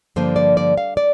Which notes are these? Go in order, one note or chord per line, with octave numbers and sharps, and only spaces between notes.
G2 D3 F3 A#3 C5
D5
D5
F5
D5